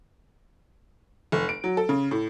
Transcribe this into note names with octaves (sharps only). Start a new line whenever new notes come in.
F1
D7
F#3
A4
C#3
A2